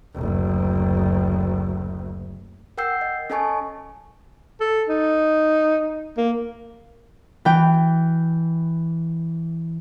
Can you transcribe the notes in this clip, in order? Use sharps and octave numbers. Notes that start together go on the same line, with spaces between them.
F#1 D2
A#4 F#5 G5 E6 G6 C7
D#5
C#4 A4 D#5 G#5 A5 C#6
A4
D#4
A#3
E3 G5